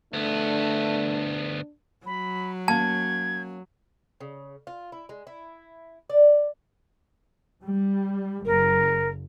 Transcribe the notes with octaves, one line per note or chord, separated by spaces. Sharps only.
D2 A3 B3 D4
F#3 B5
A#3 C#4 A5 G#6
C#3
F4
E4
G#3
E4
D5
G3
F#1 A#4